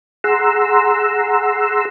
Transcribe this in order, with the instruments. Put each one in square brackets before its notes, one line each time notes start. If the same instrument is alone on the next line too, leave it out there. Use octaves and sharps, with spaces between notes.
[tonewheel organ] G#4 F#5 A#5 C6 E6